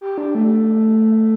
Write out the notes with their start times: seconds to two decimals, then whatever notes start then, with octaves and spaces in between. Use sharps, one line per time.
0.01 G4
0.18 D4
0.35 A3